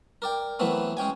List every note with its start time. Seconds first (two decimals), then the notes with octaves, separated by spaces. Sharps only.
0.22 A#4 D5 G5
0.59 E3 F#3 A3 B3 C4
0.97 G#3 C#4 G5 G#5